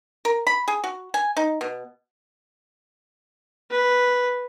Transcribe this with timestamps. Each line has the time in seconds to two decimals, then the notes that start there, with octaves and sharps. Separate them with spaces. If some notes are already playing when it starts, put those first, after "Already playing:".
0.25 A#4
0.47 B5
0.68 G#4
0.84 F#4
1.14 G#5
1.37 D#4
1.61 B2
3.71 B4